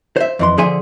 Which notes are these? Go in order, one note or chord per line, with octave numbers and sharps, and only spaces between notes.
C5 E5
F2 E3 C6
D3 F3 G#4 E5 G#5 C6